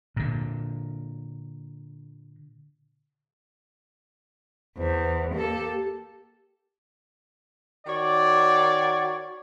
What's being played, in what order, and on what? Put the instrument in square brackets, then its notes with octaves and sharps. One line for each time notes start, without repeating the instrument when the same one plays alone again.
[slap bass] A#2 D3
[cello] E2 [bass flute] C5
[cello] A#3 A4 [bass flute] G4
[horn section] D#3 F#4 C#5 D5